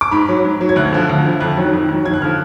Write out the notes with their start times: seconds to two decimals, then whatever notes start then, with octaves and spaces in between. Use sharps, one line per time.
0.01 D6
0.12 G#2 B5
0.29 F#3
0.45 G#2
0.61 F#3
0.69 G#6
0.76 D2 F#6
0.92 D3 F3
1.09 D2
1.25 D3 F3
1.40 F2 F#6
1.57 D#3 F#3
1.73 F2
1.89 D#3 F#3
2.05 D#2 G#6
2.14 F#6
2.21 D3 F3 F6